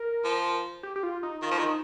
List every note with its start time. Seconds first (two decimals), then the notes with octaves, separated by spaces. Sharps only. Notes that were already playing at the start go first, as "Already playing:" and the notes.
Already playing: A#4
0.24 F3
0.83 G4
0.96 G4
1.03 F4
1.23 D#4
1.42 D#3 F4
1.51 F3
1.59 D#3
1.63 D#4